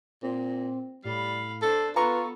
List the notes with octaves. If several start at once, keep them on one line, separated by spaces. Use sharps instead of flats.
A#2 C4
A2 G3 F5 B5
D4 A4 C5
B3 F4 A4 B4 A#5 C#6